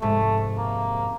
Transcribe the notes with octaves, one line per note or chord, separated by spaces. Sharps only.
F2 G#2 C3 A3
A#3